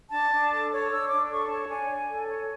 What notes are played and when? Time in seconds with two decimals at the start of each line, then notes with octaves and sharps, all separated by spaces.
0.11 D4 A5
0.31 D4
0.51 A4
0.71 C#5
0.90 D4 E6
1.09 D4 D6
1.30 A4 C#6
1.49 C#5 A5
1.69 D4 G#5
1.90 D4
2.09 A4
2.29 C#5